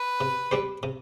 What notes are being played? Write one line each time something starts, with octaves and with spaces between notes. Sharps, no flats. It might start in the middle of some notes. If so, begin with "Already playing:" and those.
Already playing: B4
C3
G3 C4 G4 C5
C3